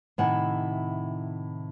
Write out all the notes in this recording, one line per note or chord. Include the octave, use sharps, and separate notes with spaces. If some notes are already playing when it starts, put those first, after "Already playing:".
A2 C3 D#3 E4 F#5 G#5